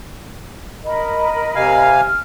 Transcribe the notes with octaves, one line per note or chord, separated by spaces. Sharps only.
A#4 D#5 B5
C3 F5 G#5
F6